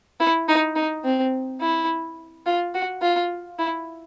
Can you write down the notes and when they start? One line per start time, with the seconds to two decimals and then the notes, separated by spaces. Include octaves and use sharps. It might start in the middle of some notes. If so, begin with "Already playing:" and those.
0.20 E4
0.48 D#4
0.76 D#4
1.04 C4
1.61 E4
2.46 F4
2.75 F#4
3.02 F4
3.59 E4